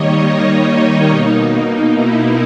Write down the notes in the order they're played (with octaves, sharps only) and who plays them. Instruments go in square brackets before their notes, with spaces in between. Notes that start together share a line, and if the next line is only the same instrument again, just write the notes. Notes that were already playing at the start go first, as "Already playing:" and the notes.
Already playing: [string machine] D#3 G3 A#3 C#5 D#5
D#4
B2 A#3
E4